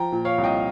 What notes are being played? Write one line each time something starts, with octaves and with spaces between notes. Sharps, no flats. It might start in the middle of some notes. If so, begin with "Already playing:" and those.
Already playing: F3 G5 A#5
A#2
C#5 F5
C2
D#5 G5